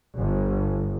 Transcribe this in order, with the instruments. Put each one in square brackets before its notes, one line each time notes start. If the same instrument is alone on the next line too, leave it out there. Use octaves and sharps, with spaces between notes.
[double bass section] G1